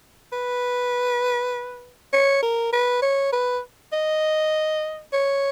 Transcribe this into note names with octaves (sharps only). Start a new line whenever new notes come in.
B4
C#5
A#4
B4
C#5
B4
D#5
C#5